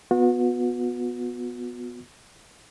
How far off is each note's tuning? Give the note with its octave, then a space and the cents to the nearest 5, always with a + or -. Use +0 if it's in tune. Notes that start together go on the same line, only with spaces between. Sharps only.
B3 +0 F#4 -40